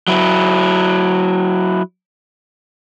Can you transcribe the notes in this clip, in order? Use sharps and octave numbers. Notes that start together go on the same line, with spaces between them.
F#3 E4